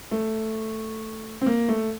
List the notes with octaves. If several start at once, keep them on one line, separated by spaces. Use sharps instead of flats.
A3
C4
A#3
A3